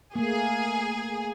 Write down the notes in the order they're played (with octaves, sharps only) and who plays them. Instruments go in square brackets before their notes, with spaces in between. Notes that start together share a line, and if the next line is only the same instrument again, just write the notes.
[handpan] A3 A#3 [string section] G#4